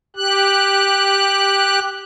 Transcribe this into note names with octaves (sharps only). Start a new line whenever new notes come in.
G4 F#6